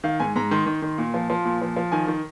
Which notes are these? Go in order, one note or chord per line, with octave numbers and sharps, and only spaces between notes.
D#3 F5
G#2 G#5
G#2 A#5
D#3 C6
D#3
D#3
A#2
F3
F3
A#2
F3
F3
D#3 G#5
D#3